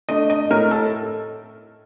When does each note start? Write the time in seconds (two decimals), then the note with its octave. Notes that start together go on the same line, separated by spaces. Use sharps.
0.09 A3 D4 D#5
0.30 D#5
0.50 A2 A#4
0.71 A4